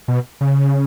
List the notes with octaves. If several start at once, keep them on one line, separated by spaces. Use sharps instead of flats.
B2
C#3